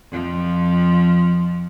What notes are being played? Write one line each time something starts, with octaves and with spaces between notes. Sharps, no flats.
F2 F3